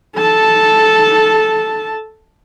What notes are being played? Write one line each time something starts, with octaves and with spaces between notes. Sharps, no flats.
A4 A5